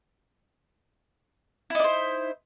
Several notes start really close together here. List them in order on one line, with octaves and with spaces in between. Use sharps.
E4 D#4 D5 C5